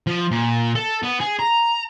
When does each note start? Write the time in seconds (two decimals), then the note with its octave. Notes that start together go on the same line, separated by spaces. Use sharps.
0.07 F3
0.31 A#2
0.75 A4
1.03 B3
1.21 G#4
1.39 A#5